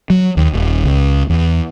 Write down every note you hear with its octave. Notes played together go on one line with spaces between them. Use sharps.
F#3
D#2
D#1
C#2
E2